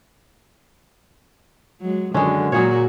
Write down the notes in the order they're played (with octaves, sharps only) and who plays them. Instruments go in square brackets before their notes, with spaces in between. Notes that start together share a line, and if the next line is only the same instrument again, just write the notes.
[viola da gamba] F#3 G#3
[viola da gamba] F#2 D#3 [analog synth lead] D3 [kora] G#3 C#4
[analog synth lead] A#2 [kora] F#3 G#4 C#5 [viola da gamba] F#4